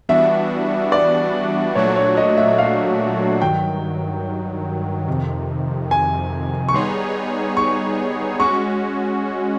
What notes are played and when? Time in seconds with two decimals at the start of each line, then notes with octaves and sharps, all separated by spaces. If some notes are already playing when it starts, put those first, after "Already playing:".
0.09 E3 G3 B3 D4 F#4 E5
0.92 D5
1.75 A#2 F#3 A3 D4 F#4 C#5
1.96 C#5
2.17 D#5
2.37 E5
2.58 F5
3.41 G2 D#3 F#3 G5
5.08 F2 C3 D#3
5.91 G#5
6.69 C#6
6.73 G3 B3 D#4 G#4 C#5 C6
7.57 C#6
8.39 G#3 C#4 F#4 C#6